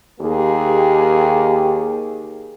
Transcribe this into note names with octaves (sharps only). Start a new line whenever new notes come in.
D#2 A#3 G4 G#4